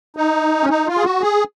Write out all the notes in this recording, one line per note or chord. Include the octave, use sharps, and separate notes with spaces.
D#4
C#4
D#4
F4
G#4
F#4
G#4